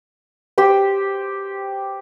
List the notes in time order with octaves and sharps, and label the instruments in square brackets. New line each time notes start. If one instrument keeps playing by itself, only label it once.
[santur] G4 C5 G5